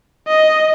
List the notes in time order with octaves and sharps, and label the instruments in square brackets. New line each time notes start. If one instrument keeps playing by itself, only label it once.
[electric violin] D#5